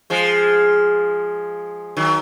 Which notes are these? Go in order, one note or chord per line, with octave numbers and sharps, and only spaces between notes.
F3 G#3
D#3 F#3